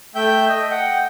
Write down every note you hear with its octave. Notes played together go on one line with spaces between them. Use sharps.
A3 E5 G5 G6
D#5
F#5 G5